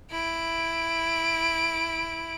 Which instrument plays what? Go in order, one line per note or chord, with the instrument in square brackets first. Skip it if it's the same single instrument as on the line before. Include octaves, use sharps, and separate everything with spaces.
[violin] E4 D7